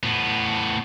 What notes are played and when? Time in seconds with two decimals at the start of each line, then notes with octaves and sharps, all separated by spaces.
0.03 A2 B3